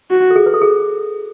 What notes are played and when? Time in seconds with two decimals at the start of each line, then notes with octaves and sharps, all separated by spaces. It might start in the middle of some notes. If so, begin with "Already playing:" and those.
0.10 F#4
0.31 A4
0.36 G#4
0.46 B4
0.54 A4
0.62 G#4